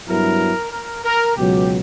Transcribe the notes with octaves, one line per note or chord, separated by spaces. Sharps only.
G2 F#3 B3 E4 A#4
A#4
A#4
C#2 B2 F#3 G4